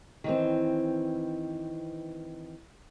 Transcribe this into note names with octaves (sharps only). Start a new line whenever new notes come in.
D#3 E3 C4